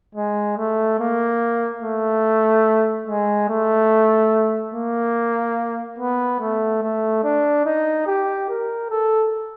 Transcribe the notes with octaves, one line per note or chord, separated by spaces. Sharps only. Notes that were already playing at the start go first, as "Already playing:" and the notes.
G#3
A3
A#3
A3
G#3
A3
A#3
B3
A3
A3
D4
D#4
G4
A#4
A4